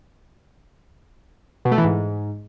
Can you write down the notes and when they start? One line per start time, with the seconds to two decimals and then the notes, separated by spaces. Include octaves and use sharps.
1.65 B2
1.72 A3
1.78 E3
1.84 G#2